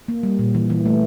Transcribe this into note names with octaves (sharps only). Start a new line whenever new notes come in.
A#3
G3
A#2
E3
E3
A3